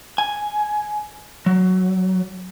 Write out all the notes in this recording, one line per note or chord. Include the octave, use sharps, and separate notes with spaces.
G#5
F#3